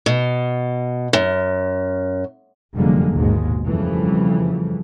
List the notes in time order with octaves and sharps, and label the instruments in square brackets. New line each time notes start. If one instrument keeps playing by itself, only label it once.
[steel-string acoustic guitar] B2
F#2
[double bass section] F1 F#2 D3 G3 G#3 A#3
G#1 D#2 G#2 B2 G#3
F2 C#3 E3 F3 G3 A3